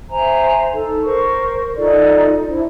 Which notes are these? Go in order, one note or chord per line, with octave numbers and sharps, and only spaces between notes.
C5 E5 G#5 A#5
D#4 A4
A#4 C5 C#6
D#4 F4 A4 D5
D4 E4 C5